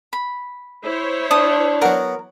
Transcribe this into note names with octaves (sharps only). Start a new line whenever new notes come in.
B5
E4 C5 C#5
D4 A5 D#6
F#3 B3 A#4